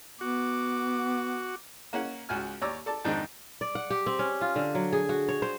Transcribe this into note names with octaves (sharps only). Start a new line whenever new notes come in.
B3 F#4 D6
A#3 C#4 F#5
C#2 F#4 G#5 F6
D#2 C#5 D5 A#5 D6 E6
A4 D5 A5
F2 G#2 D#3 D4 D#4
D5
F#5
G4
C4
C#4
F4
D3
F#3
G#4
F#4
C#5
C5